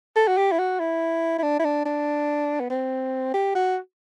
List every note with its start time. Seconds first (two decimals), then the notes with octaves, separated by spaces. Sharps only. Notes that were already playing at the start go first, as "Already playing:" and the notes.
0.16 A4
0.28 F#4
0.37 G4
0.52 E4
0.59 F#4
0.79 E4
1.38 E4
1.43 D4
1.60 E4
1.65 D4
1.85 D4
2.60 B3
2.70 C4
3.34 G4
3.55 F#4